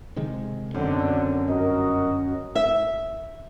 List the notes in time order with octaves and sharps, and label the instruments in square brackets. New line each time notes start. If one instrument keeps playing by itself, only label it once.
[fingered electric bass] C3 D#3 G#3
[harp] F#2 [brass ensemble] B2 D3 [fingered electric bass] C4
[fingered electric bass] G1 [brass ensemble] F#4 A#4 D#5
[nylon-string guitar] E5